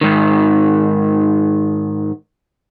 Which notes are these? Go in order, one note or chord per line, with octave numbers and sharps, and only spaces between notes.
G#2 D#3